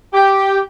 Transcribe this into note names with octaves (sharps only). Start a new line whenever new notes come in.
G4